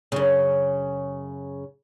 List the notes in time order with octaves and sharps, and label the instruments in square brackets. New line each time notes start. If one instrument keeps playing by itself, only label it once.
[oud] F#2 C#3